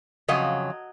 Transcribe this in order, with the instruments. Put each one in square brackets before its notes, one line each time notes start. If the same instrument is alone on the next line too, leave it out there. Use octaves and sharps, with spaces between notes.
[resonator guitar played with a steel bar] F2 C#3 F#3 D#5